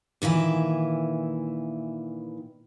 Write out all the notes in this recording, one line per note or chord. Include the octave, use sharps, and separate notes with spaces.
A#2 D#3 E3 E5